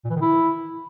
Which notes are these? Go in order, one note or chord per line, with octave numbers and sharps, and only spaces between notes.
A#2
E3
D#3
E4